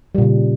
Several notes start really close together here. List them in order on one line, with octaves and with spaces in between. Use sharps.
G3 A#2 C#3